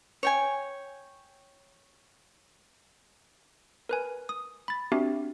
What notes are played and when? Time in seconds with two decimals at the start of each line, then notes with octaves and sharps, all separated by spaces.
0.23 C#5 G5 G#5
3.89 A#4 B4 G#5
4.29 D#6
4.68 B5 A6
4.92 C4 D4 F#4 G4 E5